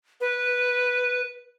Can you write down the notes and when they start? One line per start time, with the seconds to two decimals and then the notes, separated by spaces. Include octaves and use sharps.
0.21 B4